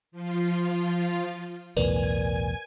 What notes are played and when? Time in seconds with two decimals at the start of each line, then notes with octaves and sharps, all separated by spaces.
0.12 F3 F4
1.77 B1 E2 A2 A#4 B4 D5 G#5